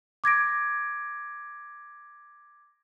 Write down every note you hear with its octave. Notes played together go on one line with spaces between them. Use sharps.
D6 G#6 A#6 D7